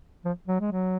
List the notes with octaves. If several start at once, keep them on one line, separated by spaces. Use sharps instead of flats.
F3
F#3
G#3
F#3